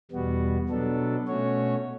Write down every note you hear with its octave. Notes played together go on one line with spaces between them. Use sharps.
E2 B2 G3 B3 F#4
B2 F#3 B3 D4 A4
B2 A3 C#4 F#4 C#5